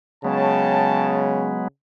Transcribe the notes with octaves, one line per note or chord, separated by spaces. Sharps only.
C#3 F#3 G#3 B3 C#5 G5 A5